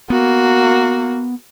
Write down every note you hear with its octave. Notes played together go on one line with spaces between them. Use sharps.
A#3 B3 F#4